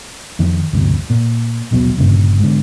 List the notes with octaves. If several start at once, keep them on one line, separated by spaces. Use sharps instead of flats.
F2 D#3
E1 D2 G2 C3
A#2
A#1 D#2 B2 F#3
G1 G2 A#2 C#3
G#2 D3